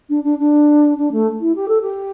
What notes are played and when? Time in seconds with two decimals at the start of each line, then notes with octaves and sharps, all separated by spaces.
0.09 D4
0.24 D4
0.38 D4
0.97 D4
1.12 A3
1.41 E4
1.55 G4
1.68 A4
1.82 G4